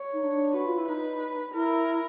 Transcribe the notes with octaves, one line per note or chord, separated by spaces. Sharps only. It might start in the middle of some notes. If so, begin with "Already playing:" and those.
Already playing: C#5
D#4
D4
F#4 B4
F4
E4
D#4 B4
E4 A#4